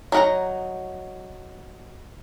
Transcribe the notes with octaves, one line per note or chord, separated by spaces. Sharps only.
F#3 D#4 A#4 F#5 A#5